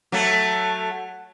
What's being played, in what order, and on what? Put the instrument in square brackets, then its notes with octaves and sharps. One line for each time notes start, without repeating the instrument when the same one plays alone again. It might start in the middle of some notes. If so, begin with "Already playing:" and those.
[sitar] F#3 A3